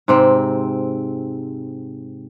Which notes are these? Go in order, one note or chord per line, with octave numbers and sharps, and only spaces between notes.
G#2 C3 C4